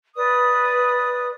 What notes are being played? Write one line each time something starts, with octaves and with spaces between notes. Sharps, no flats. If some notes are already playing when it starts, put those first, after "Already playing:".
B4 D5 D#6